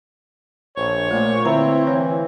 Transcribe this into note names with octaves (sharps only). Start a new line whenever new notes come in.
A#1 C5 C#5
A#2 A3 A#3
D3 C4 E4 B4 A#5
E3 C#5 F5